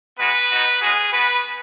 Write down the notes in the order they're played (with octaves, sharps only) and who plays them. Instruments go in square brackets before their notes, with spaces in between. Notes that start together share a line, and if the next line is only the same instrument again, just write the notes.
[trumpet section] G#3 B3 F#4 B4
B3 D#4 F#4
G#3 C#4 F#4 G#4
B3 F#4 B4